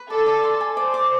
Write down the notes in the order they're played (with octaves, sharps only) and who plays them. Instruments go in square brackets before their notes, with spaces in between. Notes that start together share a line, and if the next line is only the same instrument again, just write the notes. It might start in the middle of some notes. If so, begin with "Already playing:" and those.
Already playing: [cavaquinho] B4
[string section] A4 [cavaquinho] D5
[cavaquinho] D5
C6
G#5
[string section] C5 [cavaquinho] D5
[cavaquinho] D6